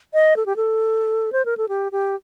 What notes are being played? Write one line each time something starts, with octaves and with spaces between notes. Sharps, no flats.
D#5
A4
G4
A4
C5
A#4
A4
G4
G4